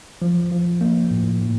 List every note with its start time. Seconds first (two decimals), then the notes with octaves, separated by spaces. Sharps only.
0.22 F3
0.51 F3
0.81 A#3
1.11 A2
1.41 A2